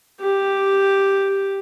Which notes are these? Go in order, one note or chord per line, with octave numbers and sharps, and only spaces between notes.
G4